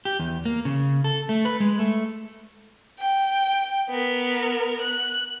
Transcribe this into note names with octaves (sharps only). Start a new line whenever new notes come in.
G4
E2
A#3
C#3
A4
A3
B4
G#3
A3
G5
B3 A#4
F#6